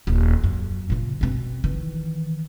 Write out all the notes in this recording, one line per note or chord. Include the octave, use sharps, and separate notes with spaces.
D#1
F#2
A#2 C#3
B2 C4
D#3 E3